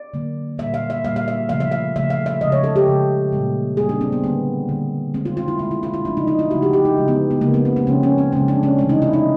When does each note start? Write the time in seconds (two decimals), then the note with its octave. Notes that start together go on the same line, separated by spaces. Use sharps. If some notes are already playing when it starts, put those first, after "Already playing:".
Already playing: D5
0.14 D3 F#3 A#3
0.58 A#2 G3 A#3 E5
0.74 F5
0.90 E5
1.05 A#2 G3 A#3 F5
1.16 F5
1.28 E5
1.49 C#3 F3 A3 F5
1.60 E5
1.71 F5
1.95 C#3 F3 A3 E5
2.10 F5
2.26 E5
2.41 C#3 F3 G#3 D#5
2.52 C#5
2.64 A4
2.76 G4
2.87 C#3 F3 G#3
3.32 A#2 G3 A#3
3.77 A#2 G3 A#3 G#4
3.89 D4
4.01 C4
4.12 B3
4.24 D3 G3 A#3 B3
4.69 D3 G3 A#3
5.14 B2 G#3 C4
5.25 F4
5.37 F4
5.48 E4
5.59 B2 G#3 F4
5.71 E4
5.83 F4
5.94 E4
6.05 C#3 F3 A3 D4
6.17 D#4
6.28 D#4
6.39 E4
6.50 C#3 F3 A3 F#4
6.62 G4
6.73 G4
6.85 D#4
6.97 C#3 F3 G#3
7.08 B3
7.31 B3
7.41 C#3 F3 G#3 A#3
7.54 B3
7.65 C4
7.76 C4
7.87 C#3 F3 G#3 C#4
8.03 C#4
8.18 C4
8.32 C#3 F3 G#3 C#4
8.48 D4
8.63 C#4
8.79 C3 E3 A3 D4
8.89 D#4
9.02 E4
9.13 D#4